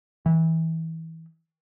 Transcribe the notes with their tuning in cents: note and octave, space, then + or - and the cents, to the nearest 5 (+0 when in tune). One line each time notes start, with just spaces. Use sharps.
E3 -25